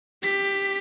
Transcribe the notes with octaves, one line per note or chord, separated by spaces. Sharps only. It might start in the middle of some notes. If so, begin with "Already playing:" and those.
G4 B6